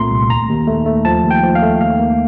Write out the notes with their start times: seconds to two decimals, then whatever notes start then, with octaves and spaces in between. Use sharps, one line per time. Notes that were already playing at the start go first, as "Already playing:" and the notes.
Already playing: C2 A#2 A3 C4 A#5 C6
0.10 C2
0.30 D#2 A#5
0.49 D#2
0.67 A3
0.86 A3
1.05 F3 A5
1.24 D#2
1.31 G5
1.43 F3
1.55 F5
1.62 A3
1.81 D#2 F5
1.99 A#3